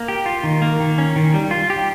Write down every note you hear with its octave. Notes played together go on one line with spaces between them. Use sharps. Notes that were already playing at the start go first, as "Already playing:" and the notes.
Already playing: A#3
G4
F4
D#3
A#3
D#3
C#4
D#3
G3
F4
G4